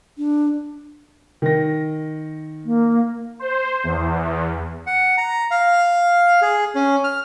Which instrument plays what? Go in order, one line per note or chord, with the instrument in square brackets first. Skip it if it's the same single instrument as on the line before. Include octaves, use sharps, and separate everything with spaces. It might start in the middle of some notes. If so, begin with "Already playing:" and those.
[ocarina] D4
[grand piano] D#3 A#6
[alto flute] A#3
[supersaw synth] C5
E2
[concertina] F#5
A#5
F5
G#4
C#4
F6